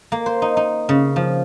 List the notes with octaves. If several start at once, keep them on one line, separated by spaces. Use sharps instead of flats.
A#3
C5
D#4
D#4
C#3
F3